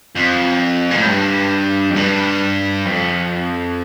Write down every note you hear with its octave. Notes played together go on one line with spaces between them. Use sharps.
F2
A#2
A2
G2
F2
G2
F2